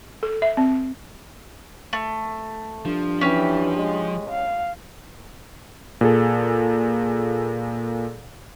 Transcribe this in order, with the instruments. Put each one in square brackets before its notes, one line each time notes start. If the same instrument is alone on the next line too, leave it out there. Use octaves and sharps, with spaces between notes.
[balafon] A4
E5
C4
[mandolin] A3
[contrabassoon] G2 [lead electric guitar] F3
[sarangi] E3 [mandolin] C#4 G4
[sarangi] G#3
F5
[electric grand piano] A#2 G#4 A4